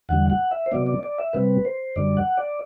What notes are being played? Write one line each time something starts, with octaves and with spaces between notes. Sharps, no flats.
E2 D3 G3 F#5
F#5
E5
C5
C3 F#3 B3 D5
D5
D5
E5
C3 G3 C4 B4
C5
F#2 D3 G3 D5
F#5
D5